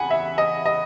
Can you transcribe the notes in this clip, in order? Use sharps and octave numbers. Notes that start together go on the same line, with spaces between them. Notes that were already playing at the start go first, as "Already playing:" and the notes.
Already playing: E2 C#3 F#5 G#5 B5
E5
D#5
D#5